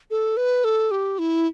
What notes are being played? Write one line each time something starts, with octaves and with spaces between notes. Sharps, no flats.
A4
B4
A4
G4
E4